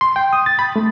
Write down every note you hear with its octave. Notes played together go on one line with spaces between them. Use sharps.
C6
G5
D#6
A6
B5
A3